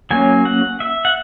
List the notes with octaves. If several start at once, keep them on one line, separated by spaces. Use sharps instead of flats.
F#3 A#3 C#4 G#5
F#5
E5
F#5